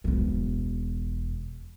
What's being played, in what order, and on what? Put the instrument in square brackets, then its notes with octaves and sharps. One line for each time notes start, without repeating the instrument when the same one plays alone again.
[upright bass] E1 E3